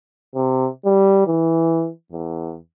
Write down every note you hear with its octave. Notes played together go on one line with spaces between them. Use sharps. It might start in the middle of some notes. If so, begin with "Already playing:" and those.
C3
G3
E3
E2